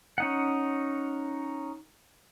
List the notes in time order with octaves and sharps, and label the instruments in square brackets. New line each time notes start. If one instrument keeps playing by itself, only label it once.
[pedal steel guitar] C#4 D#4 F#5